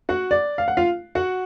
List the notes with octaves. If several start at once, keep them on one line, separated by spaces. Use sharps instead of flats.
F#4 F#5
D5
F5
F#5
F4 F5
F#4 F#5